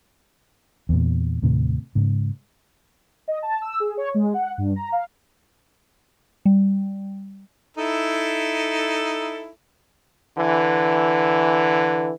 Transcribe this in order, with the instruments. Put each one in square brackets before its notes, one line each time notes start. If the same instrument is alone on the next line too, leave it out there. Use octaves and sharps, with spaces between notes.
[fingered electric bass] E2 A#2
D#2 A2 C3
G#2 C#3
[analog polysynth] D#5
A5
E6
G#4
C#5
G#3
F#5
G2
A#5
F5
[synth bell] G3
[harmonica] D#4 E4 A4
[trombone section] D3 E3